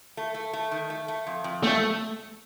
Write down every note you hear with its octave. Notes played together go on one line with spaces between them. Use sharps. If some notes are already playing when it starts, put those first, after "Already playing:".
A3
A3
A3
D#3
A3
A3
F2
F2
G3 A3